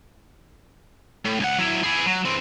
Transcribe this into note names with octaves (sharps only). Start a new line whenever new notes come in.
A2
C#2 F#5
F#3 E4
E4 G#4
F#3
E3 C4